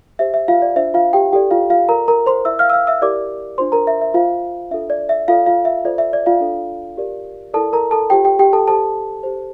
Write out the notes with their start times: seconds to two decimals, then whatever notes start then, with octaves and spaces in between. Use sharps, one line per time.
0.19 G4 C5 E5
0.34 E5
0.48 F4 F5
0.62 D5
0.76 D4 F4 C5 E5
0.94 F4 F5
1.13 G4 G5
1.32 E4 G4 A4 D5 G5
1.51 F4 F5
1.70 F4 F5
1.89 F4 A4 A#4 D5 A#5
2.08 A#4 A#5
2.26 C5 C6
2.45 E4 A#4 D5 E5 E6
2.59 F5 F6
2.70 E6
2.73 F5 F6
2.87 E5 E6
3.01 E4 G4 A#4 D5 D6
3.58 D4 F4 C5 C6
3.72 A#4 A#5
3.87 E5
4.01 E5
4.14 F4 C5 F5
4.71 D4 F4 A4 E5
4.90 D5
5.09 E5
5.28 F4 A4 D5 F5
5.46 F4 F5
5.65 E5
5.85 F4 A4 C5 D5
5.98 E5
6.13 D5
6.26 F4 F5
6.40 D4 A4 D5
6.97 G4 A#4 D5
7.54 E4 A4 A#4 D5 A5
7.73 A#4 A#5
7.91 A4 A5
8.10 F4 G4 A4 C5 G5
8.24 G4 G5
8.39 G4 G5
8.53 A4 A5
8.67 G4 A4 C5 A5
9.23 G4 C5